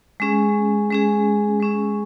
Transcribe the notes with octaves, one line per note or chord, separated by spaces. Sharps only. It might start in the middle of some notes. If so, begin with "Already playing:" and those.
G#3 C#4 G#4
G#3 C#4 G#4
G#3 C#4 G#4